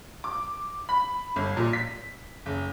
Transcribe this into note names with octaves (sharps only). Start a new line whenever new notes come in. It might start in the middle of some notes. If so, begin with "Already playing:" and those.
D6
B5
G1
A#2
B6
F#1